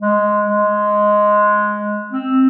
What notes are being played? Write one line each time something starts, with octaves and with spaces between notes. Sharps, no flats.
G#3
G#3
C4